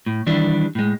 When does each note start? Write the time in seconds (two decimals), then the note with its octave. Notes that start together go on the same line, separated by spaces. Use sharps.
0.06 A2
0.27 D#3 E3 G3 D4
0.75 A2 G#3